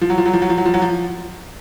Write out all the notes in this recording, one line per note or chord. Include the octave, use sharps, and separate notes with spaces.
F3
F#3
F3
F#3
F3
F#3
F3
F#3
F3
F#3
F3